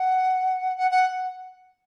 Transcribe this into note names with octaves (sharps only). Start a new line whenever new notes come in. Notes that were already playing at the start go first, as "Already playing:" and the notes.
Already playing: F#5
F#5
F#5